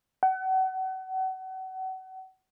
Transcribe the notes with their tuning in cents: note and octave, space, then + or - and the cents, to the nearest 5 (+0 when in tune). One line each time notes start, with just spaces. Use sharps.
F#5 +35